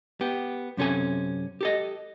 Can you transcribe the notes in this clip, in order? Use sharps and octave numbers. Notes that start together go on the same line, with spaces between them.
B3 G4
F#2 C3 C#4 A4 G#5
G4 A4 D#5